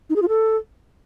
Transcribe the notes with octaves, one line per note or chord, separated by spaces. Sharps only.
D#4
G#4
F4
A4